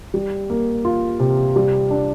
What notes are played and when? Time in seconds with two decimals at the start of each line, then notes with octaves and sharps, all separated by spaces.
0.14 G3
0.50 A#3
0.85 F4
1.20 C3
1.56 G3
1.91 D4